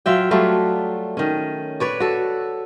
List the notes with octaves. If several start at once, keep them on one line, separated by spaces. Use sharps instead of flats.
F#3 F4 E5 G5
F#3 G3 A3 F4
D#3 C#4
B4 C#5 D5
F#4 A4